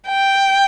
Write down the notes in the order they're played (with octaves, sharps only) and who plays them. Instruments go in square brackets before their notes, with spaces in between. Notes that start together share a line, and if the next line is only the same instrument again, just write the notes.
[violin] G5